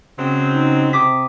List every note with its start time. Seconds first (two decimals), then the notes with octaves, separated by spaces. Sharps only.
0.19 C#3 F#3 G#3 C4
0.52 D#4
0.93 C3 D6 D#6 B6